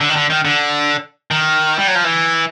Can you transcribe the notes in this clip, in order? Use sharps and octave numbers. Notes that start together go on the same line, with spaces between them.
D3
D#3
D3
D#3
D3
D#3
G3
F#3
F3
E3